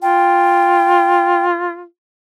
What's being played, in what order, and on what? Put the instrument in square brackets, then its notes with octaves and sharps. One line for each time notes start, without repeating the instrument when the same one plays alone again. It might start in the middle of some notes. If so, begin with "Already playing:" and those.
[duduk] F4 [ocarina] G5